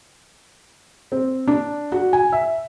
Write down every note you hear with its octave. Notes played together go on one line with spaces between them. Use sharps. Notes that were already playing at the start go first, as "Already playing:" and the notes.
C4
D4
F#4
G#5
E5